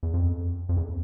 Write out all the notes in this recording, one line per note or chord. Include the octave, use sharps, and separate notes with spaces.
E2
F2
F2
E2